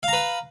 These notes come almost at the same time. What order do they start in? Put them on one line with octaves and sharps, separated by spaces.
F5 A#5 B4